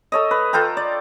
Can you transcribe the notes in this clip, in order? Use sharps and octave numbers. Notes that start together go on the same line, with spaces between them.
A4 C#5 D#5
B4
F4 A4 G5 A#5
D5